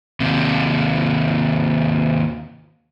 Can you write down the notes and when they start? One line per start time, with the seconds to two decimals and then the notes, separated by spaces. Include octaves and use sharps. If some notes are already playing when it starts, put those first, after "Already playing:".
0.20 D#2 C3